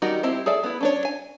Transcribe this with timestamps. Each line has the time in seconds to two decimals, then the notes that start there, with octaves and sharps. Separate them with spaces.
0.02 D#3 G3 D#4 F#4 G4
0.23 C4 E4 G4 C5
0.46 G#4 A4 D5 E5
0.63 B3 E4
0.81 C#4 D4 C#5
1.05 G#5